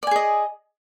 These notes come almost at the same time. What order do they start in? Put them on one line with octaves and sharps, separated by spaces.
D5 G#5 G#4 D#5